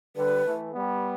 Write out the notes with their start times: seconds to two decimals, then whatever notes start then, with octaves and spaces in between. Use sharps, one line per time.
0.16 D3 G3 B4
0.45 E3 A3
0.74 G3 B3